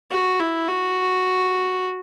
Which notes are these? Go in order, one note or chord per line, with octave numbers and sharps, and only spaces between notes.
F#4
E4
F#4